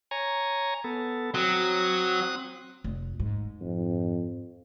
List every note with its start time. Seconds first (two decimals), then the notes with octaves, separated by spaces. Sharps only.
0.11 C#5 G#5 A#5
0.84 B3 A4
1.34 F#3 C4 D#6 F#6
2.84 F1
3.20 G#2
3.61 F2